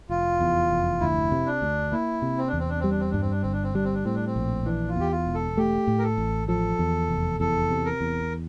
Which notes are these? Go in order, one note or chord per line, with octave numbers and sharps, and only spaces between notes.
F1 F4
E2
F1
D2 E4
C3
D4
D2
A#3 E4
C3
C4
D4
E2
C4
D4
G3 C4
D4
C4
G2 D4
C4
D4
G1 C4
D4
C4
G3 D4
C4
D4
A2 C4
D4
C4
A#1
E3 D4
F4
E2 G4
F4
E1
A4
A3 G4
A2
A#4
A4
A1
F3 A4
E2
F1
E2 A4
C3
A#4
E2